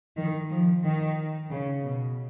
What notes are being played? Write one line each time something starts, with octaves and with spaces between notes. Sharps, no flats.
D#3
F3
D#3
C#3
B2